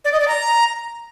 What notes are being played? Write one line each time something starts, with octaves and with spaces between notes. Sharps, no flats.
D5
D#5
D5
A#5